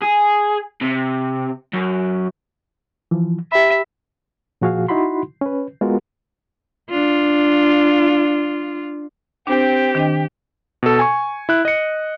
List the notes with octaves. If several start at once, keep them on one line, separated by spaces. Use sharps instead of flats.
G#4
C3
F#2
E3 F3
G4 E5 B5
A#2 F3 F#4 G#4 F5
D#4 E4 F#4 F#5 B5 C6
C#4 B4
G#3 B3 F4 F#4 A#4
D4 F4
C4 D4 G4
D#3 D4 D#5
B2 A4
G#5 C#6
E4 F#6
D#5 C#7